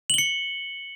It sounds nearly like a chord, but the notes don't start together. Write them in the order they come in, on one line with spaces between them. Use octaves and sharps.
F#7 G7 C#7